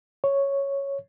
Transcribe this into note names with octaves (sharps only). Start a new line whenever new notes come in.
C#5